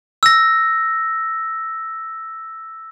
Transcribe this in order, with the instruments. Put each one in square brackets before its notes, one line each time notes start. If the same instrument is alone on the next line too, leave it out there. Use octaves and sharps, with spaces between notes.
[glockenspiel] E6 A#6